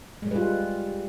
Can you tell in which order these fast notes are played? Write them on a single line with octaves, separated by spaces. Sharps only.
G#3 G3 B4 F4